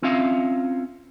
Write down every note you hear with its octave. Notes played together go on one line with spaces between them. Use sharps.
C4 C#4 F4 E5 F5